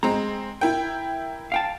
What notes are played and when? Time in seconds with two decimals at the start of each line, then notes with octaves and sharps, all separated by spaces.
0.03 G#3 C4 A#5
0.61 E4 A#4 G5
1.52 F5 G5 A5